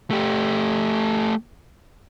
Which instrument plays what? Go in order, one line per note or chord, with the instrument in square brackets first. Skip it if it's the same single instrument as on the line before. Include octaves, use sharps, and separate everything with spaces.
[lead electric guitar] A3 G4